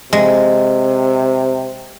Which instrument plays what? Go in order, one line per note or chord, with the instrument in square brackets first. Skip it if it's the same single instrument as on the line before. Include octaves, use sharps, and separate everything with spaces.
[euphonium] C3 [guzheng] G#3